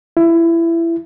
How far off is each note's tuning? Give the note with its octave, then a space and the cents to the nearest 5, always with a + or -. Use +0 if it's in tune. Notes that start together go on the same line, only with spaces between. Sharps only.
E4 +20